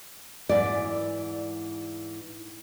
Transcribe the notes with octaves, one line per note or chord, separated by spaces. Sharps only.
G#2 E3 D5